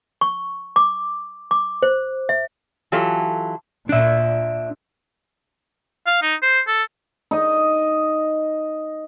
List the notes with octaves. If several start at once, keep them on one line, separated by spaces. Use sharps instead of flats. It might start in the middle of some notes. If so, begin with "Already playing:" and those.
C#6
D6
D6
C5
E5
E3 F#3 E4 F4 G4 A4
A#2 D4 E5
F5
D#4
C5
A4
D#4 D#5